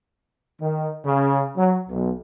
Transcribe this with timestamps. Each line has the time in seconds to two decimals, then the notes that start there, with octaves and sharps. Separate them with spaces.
0.61 D#3
1.05 C#3
1.56 F#3
1.89 B1